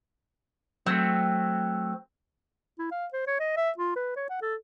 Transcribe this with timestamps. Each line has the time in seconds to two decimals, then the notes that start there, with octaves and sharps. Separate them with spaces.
0.86 F#3 A3 C4
2.79 E4
2.92 F5
3.13 C5
3.27 C#5
3.40 D#5
3.57 E5
3.78 F4
3.96 B4
4.16 C#5
4.30 F#5
4.42 A4